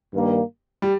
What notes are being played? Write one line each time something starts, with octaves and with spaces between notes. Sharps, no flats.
G2 D#3 G3 A#3
G3